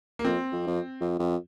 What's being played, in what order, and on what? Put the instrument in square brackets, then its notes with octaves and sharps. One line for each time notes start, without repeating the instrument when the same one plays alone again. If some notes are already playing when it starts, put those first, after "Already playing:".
[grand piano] A#3
[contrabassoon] F2 [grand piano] C4
[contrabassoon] F2
F2
F2
F2